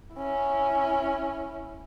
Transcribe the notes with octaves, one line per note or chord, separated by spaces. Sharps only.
C#4 E4